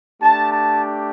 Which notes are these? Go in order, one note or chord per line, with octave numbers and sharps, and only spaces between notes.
A3 D4 G4 A5
A5